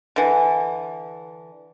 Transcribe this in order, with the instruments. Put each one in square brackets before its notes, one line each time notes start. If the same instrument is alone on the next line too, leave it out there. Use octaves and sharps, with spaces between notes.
[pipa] D3 E3